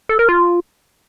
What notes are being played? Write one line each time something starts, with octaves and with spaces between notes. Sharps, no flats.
A4
A#4
F4